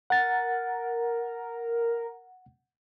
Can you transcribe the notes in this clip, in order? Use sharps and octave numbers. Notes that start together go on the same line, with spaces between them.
A#4 F#5 A6